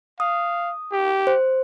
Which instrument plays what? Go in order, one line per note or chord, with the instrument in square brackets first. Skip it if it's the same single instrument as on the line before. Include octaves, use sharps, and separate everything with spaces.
[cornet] F5 [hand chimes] D#6
[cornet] G4
[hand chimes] C5